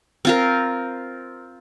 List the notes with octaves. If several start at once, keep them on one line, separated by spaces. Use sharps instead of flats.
C4 F4 A#4